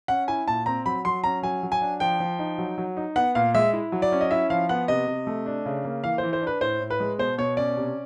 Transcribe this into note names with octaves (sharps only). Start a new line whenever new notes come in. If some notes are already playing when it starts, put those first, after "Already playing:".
C#4 F#5
E4 G#5
A#2 A5
C4 A#5
F#3 B5
F#3 C6
C#4 A#5
F#3 G#5
F#3
G#5
D4
F3 G5
F3
D#4
F#3
F#3
D#4
B3 F#5
A#2 F5
G#3 E5
E4
F#3
D5
C#4
D#5
E4 E5
F3 F5
B3 F#5
C3 D#5
C3
A3
D4
C#3
A#3
E3 F5
C5
E3
C5
D4
B4
A2 C5
A2
B4
G#3
B2 C5
B2 C#5
C#4 D5
C3